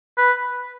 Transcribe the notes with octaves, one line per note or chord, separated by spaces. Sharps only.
B4